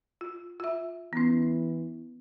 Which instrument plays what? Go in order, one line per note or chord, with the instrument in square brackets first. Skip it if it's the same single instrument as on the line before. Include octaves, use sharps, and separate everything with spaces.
[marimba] F4
F4 E5
[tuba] E3 [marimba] B3 C#4